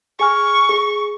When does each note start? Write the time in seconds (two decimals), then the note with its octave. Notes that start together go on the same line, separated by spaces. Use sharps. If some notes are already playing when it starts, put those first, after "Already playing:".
0.20 G#4 G#5 C#6 F6
0.69 G#4